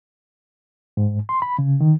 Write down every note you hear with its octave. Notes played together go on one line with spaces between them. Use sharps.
G#2
C6
B5
C#3
D#3